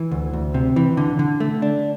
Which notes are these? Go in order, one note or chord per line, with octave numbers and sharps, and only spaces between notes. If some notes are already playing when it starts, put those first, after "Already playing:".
Already playing: E3
D2
D2
C3
E3
D3
D3
A3
D4